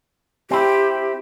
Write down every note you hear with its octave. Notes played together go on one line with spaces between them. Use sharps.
C4 E4 G4